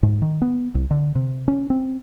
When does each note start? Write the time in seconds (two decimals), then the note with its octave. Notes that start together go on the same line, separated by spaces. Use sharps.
0.03 G#2
0.22 D#3
0.42 B3
0.75 C2
0.91 D3
1.15 C3
1.48 C#4
1.70 C4